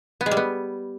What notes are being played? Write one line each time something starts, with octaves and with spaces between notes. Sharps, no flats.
B3
G#3
G3
B3